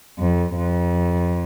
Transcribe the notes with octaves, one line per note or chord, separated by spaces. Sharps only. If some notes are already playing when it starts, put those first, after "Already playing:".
F2
F2